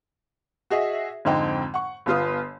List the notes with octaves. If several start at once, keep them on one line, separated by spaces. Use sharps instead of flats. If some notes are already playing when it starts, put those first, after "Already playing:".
F#4 G#4 D#5 E5
F2 G#2 D3 C4 D#4 G5
F#5 C#6
G1 B3 F4 D#6